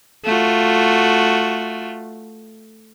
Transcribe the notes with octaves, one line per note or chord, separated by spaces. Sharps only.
A3 F4 F#4